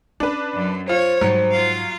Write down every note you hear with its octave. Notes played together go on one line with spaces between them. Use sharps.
C#4 D4 B4
F#2 F#3
F4 C5 C#5
G#2 F#3 G3
F4 F5